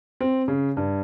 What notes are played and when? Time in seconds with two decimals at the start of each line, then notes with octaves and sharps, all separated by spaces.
0.20 C4
0.48 C#3
0.77 G2